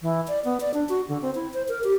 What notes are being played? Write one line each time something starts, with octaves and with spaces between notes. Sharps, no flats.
E3
D5
B3
D5
D4
F#4
D3
C4
E4
C5
A#4
G4